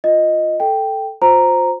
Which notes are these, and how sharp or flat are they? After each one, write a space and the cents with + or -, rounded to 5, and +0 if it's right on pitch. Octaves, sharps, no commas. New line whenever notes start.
F4 +10 D#5 +0
A4 +0 G5 +0
F4 +40 C5 +0 A#5 -5